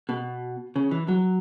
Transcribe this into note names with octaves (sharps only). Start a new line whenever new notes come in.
B2
C#3
E3
F#3